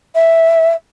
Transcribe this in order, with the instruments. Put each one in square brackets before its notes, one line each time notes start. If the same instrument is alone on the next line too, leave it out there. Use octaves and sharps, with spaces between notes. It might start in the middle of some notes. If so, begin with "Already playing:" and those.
[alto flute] E5